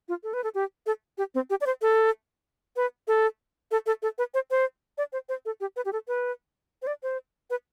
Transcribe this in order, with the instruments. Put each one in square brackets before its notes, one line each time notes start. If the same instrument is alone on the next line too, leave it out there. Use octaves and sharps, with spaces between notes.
[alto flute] F4
A4
B4
A4
G4
A4
G4
C4
G4
D5
C5
A4
B4
A4
A4
A4
A4
B4
C5
C5
D5
C5
C5
A4
G4
B4
G4
A4
B4
C5
D5
C5
B4